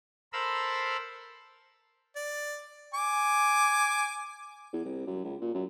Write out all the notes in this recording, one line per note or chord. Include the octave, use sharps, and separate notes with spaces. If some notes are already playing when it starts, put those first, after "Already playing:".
A4 A#4 C5 F5 B5 E6
D5
G#5 D6
E2
C2
F#2
C#2
A#2
F#2